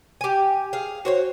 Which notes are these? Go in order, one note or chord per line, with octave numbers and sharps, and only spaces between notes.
G4 G#5
G#4 F5
F#4 C5 C#5